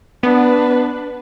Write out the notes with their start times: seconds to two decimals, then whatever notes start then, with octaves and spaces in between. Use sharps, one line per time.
0.23 B3 D4 B4